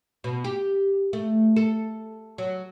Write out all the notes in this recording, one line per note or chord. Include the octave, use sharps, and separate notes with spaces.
B2
G4
A3
A4
F#3